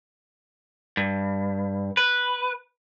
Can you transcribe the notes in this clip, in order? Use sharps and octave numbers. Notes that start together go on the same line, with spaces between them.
G2
B4